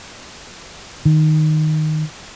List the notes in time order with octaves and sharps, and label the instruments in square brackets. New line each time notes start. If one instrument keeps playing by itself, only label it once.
[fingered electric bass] D#3